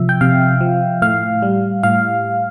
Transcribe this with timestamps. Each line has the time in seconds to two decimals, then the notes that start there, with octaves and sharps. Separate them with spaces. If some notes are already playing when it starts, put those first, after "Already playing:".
Already playing: C3 F3 E5
0.09 G5
0.21 C3 F5
0.61 F3
1.02 A2 F5
1.42 G3
1.83 A2 F5